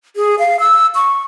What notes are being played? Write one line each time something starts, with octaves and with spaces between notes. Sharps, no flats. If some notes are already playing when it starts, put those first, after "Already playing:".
G#4
F5
E6
C#6